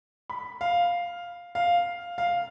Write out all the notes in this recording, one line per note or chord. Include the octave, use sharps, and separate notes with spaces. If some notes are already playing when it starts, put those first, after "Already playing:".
B5
F5
F5
F5